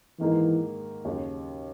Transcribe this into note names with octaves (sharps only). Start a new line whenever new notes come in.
G#2 D#3 E3 A#3 D#4 G#4
D#2 C#3 F#3